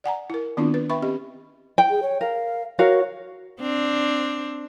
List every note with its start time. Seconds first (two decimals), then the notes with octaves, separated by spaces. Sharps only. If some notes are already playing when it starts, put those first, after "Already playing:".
0.04 D5 F#5 G#5 A#5
0.30 E4 A#4
0.57 D#3 B3 C4 D4 E4 F4
0.74 B4
0.90 B4 E5 G5 B5 C#6
1.02 C4 C#4 G4 D#5
1.78 G5
1.90 G#4
2.02 C#5
2.21 A#4 F5
2.79 F#4 A#4 C#5 F5
3.60 C4 D4